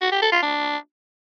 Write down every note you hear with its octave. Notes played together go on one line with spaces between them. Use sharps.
F#4
G4
A4
F4
D4